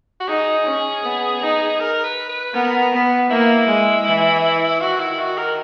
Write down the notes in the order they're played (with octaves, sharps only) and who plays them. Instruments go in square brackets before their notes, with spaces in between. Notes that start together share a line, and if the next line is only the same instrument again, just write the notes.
[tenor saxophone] F#4
[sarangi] D#4 [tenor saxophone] G#4
[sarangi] C#4
B3
D#4
[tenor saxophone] A#4
B4
B4
[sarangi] B3 [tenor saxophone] A#4
[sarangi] B3
[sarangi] A#3 [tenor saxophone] E4
[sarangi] G#3
E3
[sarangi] D#3 [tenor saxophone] F#4
[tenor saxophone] E4
F#4
A#4